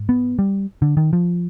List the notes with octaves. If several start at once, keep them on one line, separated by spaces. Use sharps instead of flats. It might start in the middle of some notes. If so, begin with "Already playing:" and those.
Already playing: G#2
B3
G3
D3
D#3
F3